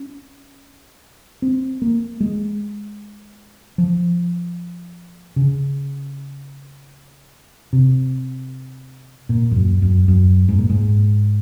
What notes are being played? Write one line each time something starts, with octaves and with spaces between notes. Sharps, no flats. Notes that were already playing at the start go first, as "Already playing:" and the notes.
Already playing: C#4
C4
A#3
G#3
F3
C#3
C3
A#2
F2
F#2
F#2
F#2
G#2
A#2
G#2